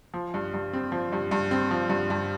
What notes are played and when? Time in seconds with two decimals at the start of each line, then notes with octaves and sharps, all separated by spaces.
0.14 F3
0.34 G2
0.54 G2
0.73 C4
0.92 F3
1.12 G2
1.31 G2
1.51 C4
1.71 F3
1.89 G2
2.10 G2